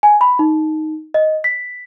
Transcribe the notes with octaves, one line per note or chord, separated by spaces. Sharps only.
G#5
B5
D#4
D#5
B6